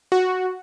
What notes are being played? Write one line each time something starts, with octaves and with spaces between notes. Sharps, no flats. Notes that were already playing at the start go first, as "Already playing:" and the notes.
F#4